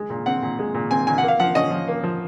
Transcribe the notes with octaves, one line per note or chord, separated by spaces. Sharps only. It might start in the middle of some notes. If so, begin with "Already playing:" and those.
Already playing: G#3
A#2
C4 F#5
A#2
G#3
A#2
C4 G#5
A#2 G#5
A#3 F#5
F5
F3 F#5
C#4 D#5
F3
A#3
F3